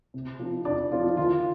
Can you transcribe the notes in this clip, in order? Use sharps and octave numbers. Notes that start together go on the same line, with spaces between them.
C3
F3 C4 D#4
C3 D4 D5
F3 C4 D#4 F4
D#3 F4